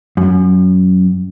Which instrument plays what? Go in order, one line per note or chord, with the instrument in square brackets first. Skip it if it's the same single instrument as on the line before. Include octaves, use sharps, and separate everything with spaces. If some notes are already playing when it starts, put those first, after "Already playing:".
[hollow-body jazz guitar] F#2